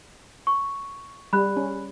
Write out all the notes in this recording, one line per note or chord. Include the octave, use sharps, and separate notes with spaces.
C#6
G3 B5 F#6
C#4